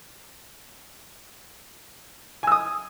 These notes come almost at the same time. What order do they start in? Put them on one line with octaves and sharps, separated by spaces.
G#5 E6 D#6